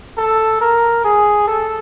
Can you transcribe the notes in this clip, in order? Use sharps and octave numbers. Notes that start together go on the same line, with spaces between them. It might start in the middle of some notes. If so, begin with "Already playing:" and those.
A4
A#4
G#4
A4